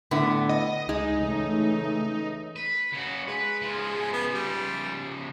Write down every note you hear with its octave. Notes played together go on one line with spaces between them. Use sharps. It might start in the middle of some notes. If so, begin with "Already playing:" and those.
A2 D3 B3
D#5
C#2 G#3 D#4
C#3 E3 A3
B4
C#3 F#4
G#3 B4
C#3 F3
B3
G3